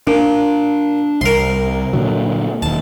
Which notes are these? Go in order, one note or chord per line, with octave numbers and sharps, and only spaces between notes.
A#2 D4
C2 A#4 C6
A#2 D3 F#3
E1 D#2 A5